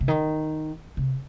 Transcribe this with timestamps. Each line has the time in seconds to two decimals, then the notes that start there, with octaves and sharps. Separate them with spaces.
0.01 C3
0.08 D#3
0.97 C3